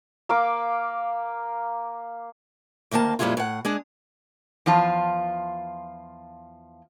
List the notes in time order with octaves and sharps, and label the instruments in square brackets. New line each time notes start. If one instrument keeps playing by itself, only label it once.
[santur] A#3 F5 D6
[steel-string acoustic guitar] D2 D#3 A#3 A#4 A5
F2 A#2 G3 G#3 E4 F4
A2 F#5
G#3 D4 G#4
[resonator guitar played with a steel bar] E2 F3 F4 A5